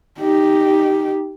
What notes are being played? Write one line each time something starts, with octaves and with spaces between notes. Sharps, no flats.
D#4 G4